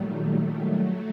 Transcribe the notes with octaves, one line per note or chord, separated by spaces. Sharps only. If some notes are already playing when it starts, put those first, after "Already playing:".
Already playing: A#2 D#3 F#3 G3 A3
F#3 A3